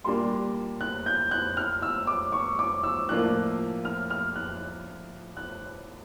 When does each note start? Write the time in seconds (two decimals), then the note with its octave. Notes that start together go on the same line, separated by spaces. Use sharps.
0.04 A#2 G3 A#3 D4 C6
0.81 F#6
1.06 G6
1.31 F#6
1.57 F6
1.82 E6
2.07 D6
2.32 C#6
2.59 D6
2.83 E6
3.09 A2 F3 A#3 D4 F4 F#6
3.85 F6
4.10 F6
4.36 F#6
5.37 F#6